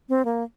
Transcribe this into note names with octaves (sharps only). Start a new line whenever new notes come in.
C4
A#3